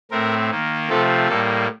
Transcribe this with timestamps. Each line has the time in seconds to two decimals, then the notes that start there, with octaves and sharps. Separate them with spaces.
0.11 A2 A3 C4 A#4
0.50 D#3 A#3
0.89 C3 F3 A3 C4 A4
1.29 A2 G3 A#3 A4